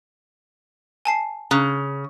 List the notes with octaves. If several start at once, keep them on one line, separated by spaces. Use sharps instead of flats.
G#5 A5 C7
C#3 A#5 F#6